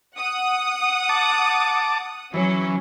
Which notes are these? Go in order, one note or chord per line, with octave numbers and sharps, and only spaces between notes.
F#5 D#6
A5 D6
E3 F#3 C#4